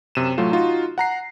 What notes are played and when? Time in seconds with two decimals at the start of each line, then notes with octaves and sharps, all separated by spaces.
0.15 F#2 C3 D#7 E7
0.38 A2 F#3 A3 F4
0.51 D#4 F4 F#4
0.98 F#5 A#5 C7